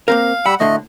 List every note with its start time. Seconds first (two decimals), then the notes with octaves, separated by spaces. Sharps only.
0.08 A#3 C4 A#4 F5
0.46 G3 F#5 B5 E6
0.60 D2 A2 D3 A3 D#5